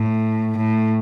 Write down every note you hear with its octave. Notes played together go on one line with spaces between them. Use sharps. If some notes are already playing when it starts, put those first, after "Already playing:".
Already playing: A2
A2